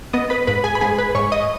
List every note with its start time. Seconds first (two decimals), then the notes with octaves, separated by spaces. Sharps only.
0.13 B3 D#5 D#6
0.30 B4 B5
0.47 G#2 B4 B5
0.64 G#4 G#5
0.75 B5
0.81 G#2 G#4 G#5
0.98 B4 B5
1.15 G#2 C#5 C#6
1.32 D#5 D#6